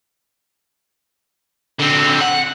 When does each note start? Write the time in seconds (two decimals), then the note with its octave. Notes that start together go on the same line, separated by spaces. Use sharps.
1.80 D3 C4
2.21 F#5